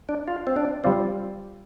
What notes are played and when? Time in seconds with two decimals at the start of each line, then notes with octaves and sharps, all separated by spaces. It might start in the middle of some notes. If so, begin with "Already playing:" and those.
0.09 D4
0.28 F4
0.47 C4
0.56 D4
0.84 G3 C4 F4 D5 F5